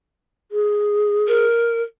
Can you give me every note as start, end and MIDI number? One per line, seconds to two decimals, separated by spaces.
0.52 1.46 68
1.28 1.82 70